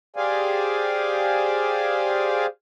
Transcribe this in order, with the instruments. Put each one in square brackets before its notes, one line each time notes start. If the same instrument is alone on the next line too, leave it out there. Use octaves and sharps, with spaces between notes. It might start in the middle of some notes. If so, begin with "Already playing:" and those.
[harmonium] G4 G#4 C5 D5 F5 G#5